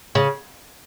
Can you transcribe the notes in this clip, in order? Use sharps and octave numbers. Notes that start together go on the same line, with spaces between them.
C#3